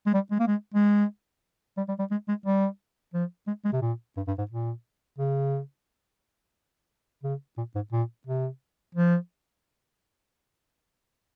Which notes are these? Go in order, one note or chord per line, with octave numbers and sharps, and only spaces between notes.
G#3
G3
G#3
A#3
G#3
G#3
G3
G3
G3
G#3
G#3
G3
F3
G#3
G#3
C3
A#2
G2
G2
G#2
A#2
C#3
C#3
A#2
G#2
A#2
C3
F3